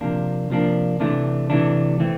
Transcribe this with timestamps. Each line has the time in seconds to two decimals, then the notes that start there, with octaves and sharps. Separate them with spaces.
0.01 C3 F3 A#3 D4
0.50 C3 F3 A#3 D4
1.00 C3 E3 A3 D4
1.50 C3 E3 A3 D4
2.00 E3 A3 C4